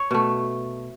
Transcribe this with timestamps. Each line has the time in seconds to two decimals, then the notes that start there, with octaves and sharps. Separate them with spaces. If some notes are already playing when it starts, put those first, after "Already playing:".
Already playing: C#5
0.11 B2 A3